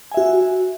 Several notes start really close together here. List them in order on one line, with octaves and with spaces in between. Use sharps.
G#5 E5 F#4